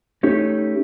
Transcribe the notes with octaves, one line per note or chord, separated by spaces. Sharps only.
A3 C#4 D#4 G4